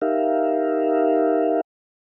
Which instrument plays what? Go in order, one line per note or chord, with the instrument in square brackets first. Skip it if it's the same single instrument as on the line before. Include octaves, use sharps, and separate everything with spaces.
[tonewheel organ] D#4 G4 A#4 E5 F5